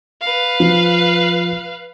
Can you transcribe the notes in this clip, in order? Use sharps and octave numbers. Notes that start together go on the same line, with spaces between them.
B4 F5
F3